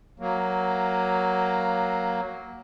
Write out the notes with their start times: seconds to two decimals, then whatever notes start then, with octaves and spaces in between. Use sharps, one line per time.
0.19 F#3 A#3